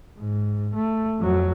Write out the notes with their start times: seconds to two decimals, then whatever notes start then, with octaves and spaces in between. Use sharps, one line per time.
0.19 G#2
0.74 A3
1.19 F2 F#3